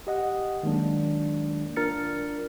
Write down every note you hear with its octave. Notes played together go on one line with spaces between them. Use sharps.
G4 D#5 F#5
D#3 F#3 G#3 A#3 D4
D4 F4 A#4 F6 A6 C#7